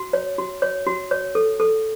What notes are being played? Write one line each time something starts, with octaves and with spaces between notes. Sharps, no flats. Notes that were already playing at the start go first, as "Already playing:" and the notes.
Already playing: F#4
C#5
F#4
C#5
F#4
C#5
A4
A4